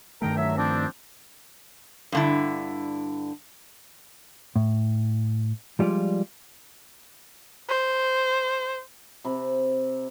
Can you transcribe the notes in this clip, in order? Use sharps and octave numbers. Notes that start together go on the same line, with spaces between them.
G2 D#3 A3 A#4 G5 A#5
F#3 E5
F3 C4 D4
G2 D3 E4
A2
F3 G3 G#3 F4 D5
C5
C3 B5